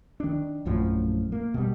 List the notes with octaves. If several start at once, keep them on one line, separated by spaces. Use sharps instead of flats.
D#3 D4
A#1 F#2 A2 F3
A#3
B2 G3